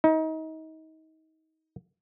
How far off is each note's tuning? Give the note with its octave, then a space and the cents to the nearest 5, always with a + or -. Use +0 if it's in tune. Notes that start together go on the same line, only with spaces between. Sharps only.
D#4 +30